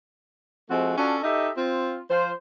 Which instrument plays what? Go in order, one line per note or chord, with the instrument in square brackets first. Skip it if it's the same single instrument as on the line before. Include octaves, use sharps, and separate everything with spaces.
[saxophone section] F3 G#3 A3 C4 F#4
C#4 D4 F4 F#4 A4
D#4 G4 A4 D#5 E5
C4 F4
F3 F4 C5